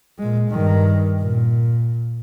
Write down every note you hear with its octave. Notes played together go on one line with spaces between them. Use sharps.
A#2 G#3
G2 D#3
A#2